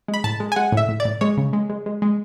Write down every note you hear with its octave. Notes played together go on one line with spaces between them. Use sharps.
G#3
B5
A2 A5
G#3
G#5
G#3 F#5
A2 E5
A2
A2 D5
G#3 C#5
C#3
G#3
G#3
G#3
G#3